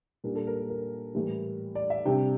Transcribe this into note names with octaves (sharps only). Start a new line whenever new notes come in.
A#2 G3 A#3 D4 A#4
A4
A#4
A#4
A#4
A2 E3 G3
D5
E5
C3 G3 D4 G5